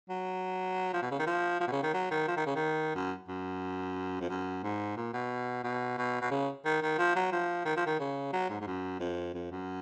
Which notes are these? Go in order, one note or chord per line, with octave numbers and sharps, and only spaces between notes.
F#3
F3
B2
C#3
D#3
F3
F3
B2
C#3
D#3
F#3
D#3
F3
D#3
C#3
D#3
F#2
F#2
F2
F#2
G#2
A#2
B2
B2
B2
B2
C#3
D#3
D#3
F3
F#3
F3
D#3
F3
D#3
C#3
F#3
G#2
G#2
F#2
F2
F2
F#2